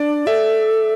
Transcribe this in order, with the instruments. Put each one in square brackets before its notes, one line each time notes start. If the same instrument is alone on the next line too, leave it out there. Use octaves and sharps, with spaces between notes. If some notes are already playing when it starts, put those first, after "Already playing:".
Already playing: [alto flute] D4 [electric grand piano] D5
[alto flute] A4 [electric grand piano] E5